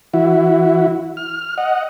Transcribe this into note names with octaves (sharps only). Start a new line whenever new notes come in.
E3 E4 F#4
F6
D#5 F#5